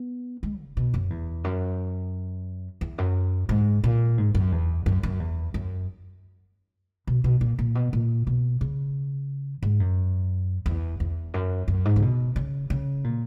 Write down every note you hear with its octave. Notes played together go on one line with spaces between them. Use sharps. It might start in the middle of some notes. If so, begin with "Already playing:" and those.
Already playing: B3
G#3
C#3
B2
F#2
E2
F#2
E2
F#2
G#2
A#2
G#2
F#2
E2
F#2
F#2
E2
F#2
B2
B2
A#2
A#2
B2
A#2
B2
C#3
G#2
F#2
E2
E2
F#2
F#2
G#2
C#3
B2
C#3
C#3
A#2